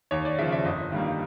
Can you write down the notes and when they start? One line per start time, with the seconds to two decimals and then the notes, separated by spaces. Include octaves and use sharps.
0.11 D#2 C#5
0.25 D5
0.38 C#3 E5
0.41 F3
0.52 E5
0.65 G1 D#5
0.92 G2 D#3 G3 A#3